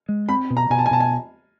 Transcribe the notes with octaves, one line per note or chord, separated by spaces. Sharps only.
G#3
C4 B5
B2
A#5
B2 G#5
A5
G#5
B2 A5
G#5